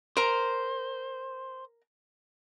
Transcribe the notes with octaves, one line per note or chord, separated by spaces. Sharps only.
A#4 C5 A#5